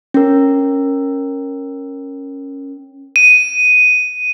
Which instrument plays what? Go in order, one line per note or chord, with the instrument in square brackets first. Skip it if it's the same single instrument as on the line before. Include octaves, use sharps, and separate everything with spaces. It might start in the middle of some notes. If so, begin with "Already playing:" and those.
[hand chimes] C#4 A#4
[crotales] D#7